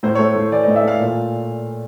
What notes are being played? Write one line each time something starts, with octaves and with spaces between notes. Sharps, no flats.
A2 C5
A3 C#5
A2 C5
E3 D5
D#5
A2
E5
A3 F5
A#2